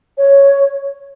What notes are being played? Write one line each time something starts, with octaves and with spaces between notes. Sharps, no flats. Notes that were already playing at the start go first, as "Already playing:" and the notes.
C#5